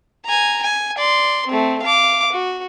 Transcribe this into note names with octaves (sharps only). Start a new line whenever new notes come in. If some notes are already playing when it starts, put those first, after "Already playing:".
G#5 A#5
G#5
D5 C6
A3 C4
F5 D6
F#4